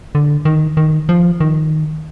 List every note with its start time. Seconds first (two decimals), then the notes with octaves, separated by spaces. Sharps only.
0.15 D3
0.45 D#3
0.77 D#3
1.09 F3
1.40 D#3